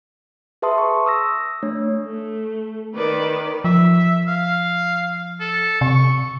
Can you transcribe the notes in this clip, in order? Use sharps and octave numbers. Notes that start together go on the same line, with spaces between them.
G#4 B4 E5 A5 C6 D#6
C#6
D#6 E6 A#6
A3 D4 C#5
A3
D#3 B4 D5
F3 E5
F5
A4
C3 C#6